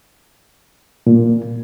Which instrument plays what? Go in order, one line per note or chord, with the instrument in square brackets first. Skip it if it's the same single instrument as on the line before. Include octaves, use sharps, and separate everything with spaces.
[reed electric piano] A#2